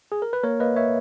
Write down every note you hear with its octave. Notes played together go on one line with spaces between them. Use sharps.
G#4
A#4
B4
A#3 A#4 C#5
A#3 B4 D#5
C#5 E5